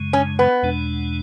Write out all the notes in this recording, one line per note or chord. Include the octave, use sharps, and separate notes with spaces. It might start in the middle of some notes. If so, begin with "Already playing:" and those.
Already playing: F#2 C#3 G#3
C#4
B3
E2 B2 G#3 D4